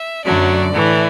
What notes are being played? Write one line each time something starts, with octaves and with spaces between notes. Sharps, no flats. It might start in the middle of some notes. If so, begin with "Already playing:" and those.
Already playing: E5
F#2 D3 F#3 A3 D5
A2 E3 A3